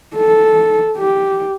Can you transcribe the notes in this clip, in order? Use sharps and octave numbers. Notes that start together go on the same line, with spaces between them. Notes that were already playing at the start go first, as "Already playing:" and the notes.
A4
G4